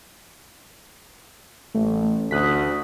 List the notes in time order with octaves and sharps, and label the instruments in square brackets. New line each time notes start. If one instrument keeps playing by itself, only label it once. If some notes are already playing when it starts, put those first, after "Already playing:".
[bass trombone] A1 [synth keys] A3
[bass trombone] D2 [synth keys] D#6 F#6 B6